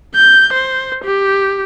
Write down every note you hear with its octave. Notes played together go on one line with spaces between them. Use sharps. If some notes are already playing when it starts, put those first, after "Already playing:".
G6
C5
G4